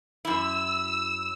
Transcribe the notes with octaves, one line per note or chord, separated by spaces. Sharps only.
F#2 E4 E6